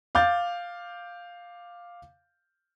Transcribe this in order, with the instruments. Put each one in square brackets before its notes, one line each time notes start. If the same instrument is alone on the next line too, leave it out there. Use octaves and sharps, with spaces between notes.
[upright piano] F5 D6 G6 A6